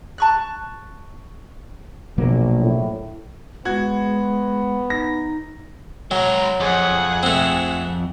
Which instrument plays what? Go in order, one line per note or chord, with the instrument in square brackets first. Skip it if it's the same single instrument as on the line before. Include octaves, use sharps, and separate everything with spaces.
[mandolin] A5 C#6 F#6
[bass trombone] A#1 [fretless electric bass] B2 F#3 A#3
[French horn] A2
[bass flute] G#3 [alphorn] B3 [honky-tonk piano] F#4 G#6
[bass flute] D#4 [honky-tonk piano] A#6
[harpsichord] F#3 [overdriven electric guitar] G#3 A#4
[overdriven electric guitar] F2 [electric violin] G#4 F#5
[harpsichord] A3 C4